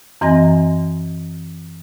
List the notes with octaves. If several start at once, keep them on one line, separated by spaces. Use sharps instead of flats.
F#2 E3 C4 D#5 G#5 A#6